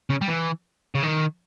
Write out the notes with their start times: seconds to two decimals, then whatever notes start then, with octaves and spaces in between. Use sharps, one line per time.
0.10 C#3
0.21 G3
0.28 E3
0.95 C#3
1.03 D#3